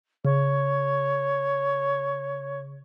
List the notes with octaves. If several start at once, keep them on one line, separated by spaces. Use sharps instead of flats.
C#3 C#5